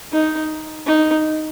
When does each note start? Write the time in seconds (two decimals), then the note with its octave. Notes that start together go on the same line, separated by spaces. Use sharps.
0.12 D#4
0.86 D#4